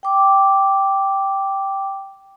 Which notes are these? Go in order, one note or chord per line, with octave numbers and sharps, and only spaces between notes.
G5 D6